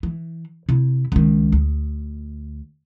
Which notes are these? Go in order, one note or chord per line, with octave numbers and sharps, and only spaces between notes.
E3
C3 E4
C#2 D#3
D2